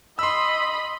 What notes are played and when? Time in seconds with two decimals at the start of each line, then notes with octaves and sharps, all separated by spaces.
0.19 D#5 B5 C6 E6